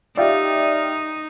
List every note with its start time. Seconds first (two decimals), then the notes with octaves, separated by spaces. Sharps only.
0.17 D#4 F4 G4 D5 E5 G5